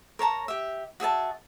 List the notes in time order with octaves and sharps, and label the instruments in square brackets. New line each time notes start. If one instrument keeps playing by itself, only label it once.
[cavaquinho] A#4 C#5 A5 A#5
G4 E5
F#4 G#4 E5 A5